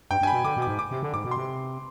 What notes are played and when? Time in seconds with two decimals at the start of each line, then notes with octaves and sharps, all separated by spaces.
0.11 G2 G5
0.21 G2 G#5
0.27 B5
0.33 B2
0.44 D3 D6
0.57 B2
0.62 D6
0.67 G#2
0.79 D6
0.91 C3
1.02 D3
1.14 G#2 D6
1.25 B2
1.31 C6
1.37 C3